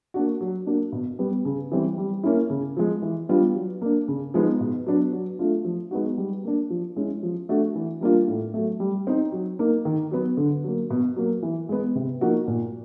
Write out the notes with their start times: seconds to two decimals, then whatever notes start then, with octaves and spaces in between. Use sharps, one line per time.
0.14 A#3 D4 F#4
0.41 F#3
0.67 A#3 D4 F#4
0.92 B2
1.19 G3 B3
1.45 C#3
1.72 E3 G3 C4
1.98 G3
2.24 A#3 C#4 E4
2.50 C#3
2.77 F3 G#3
3.02 E3
3.29 G3 B3 D4 F4
3.55 F#3
3.82 A#3 D4
4.08 C#3
4.34 F3 G#3 B3 D#4
4.61 B2
4.87 F#3 B3 D4
5.13 F#3
5.39 A3 D4 F4
5.65 F3
5.91 G#3 B3 D#4 F#4
6.18 G3
6.44 A#3 D4
6.70 F3
6.96 G#3 C#4 E4
7.23 F3
7.49 A3 D4 F#4
7.75 E3
8.01 G3 A#3 D4 F4
8.28 A2
8.54 F#3 A3
8.80 G3
9.07 C4 D#4
9.32 F#3
9.59 A#3 D#4
9.85 D#3
10.11 F#3 B3
10.37 D3
10.64 F#3 A#3
10.90 B2
11.16 F#3 A#3
11.43 E3
11.69 G#3 B3
11.95 C3
12.21 F3 A#3 D#4 F#4
12.48 A#2